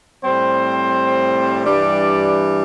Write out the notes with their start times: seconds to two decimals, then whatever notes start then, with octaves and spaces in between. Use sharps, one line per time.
0.22 A2 G3 C4 C5
1.65 G2 E3 G3 D4 D5